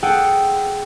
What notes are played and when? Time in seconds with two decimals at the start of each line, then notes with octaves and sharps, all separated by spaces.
0.03 G#4 A4 F#5 G5